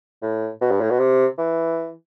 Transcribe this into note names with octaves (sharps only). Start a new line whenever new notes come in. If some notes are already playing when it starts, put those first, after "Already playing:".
A2
B2
G2
A2
B2
C3
E3